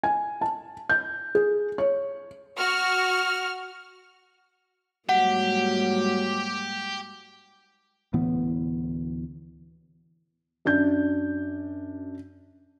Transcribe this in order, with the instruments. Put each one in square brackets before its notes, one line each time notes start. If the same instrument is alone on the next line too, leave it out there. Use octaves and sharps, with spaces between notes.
[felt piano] G#5
A5
G6
G#4
C#5
[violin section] F#4 F6
[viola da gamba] G#2 G3 A#3 [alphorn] F#3 [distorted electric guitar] G4 [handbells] F#5
[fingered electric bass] D2 A2 E3 B3
[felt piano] F#2 D4 G6